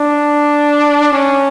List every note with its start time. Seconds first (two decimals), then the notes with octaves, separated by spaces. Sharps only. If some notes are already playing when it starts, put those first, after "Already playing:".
Already playing: D4
1.13 C#4